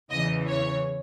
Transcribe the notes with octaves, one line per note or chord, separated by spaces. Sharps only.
E2 C#3 E3 D#5
C#5